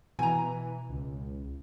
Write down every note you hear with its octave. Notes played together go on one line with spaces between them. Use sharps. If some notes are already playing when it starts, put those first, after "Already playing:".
B2 E3 G#5 A#5
C#2